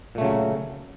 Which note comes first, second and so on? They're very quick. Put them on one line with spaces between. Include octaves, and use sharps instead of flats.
A#2 A3 C#3 F#3